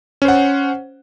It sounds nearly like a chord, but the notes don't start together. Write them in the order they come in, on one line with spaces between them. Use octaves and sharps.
C#4 C5 F#5